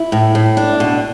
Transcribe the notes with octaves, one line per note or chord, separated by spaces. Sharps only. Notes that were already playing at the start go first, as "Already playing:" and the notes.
Already playing: E4
A2
A2
D4
B2